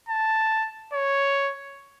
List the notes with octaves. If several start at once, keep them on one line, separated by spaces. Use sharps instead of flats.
A5
C#5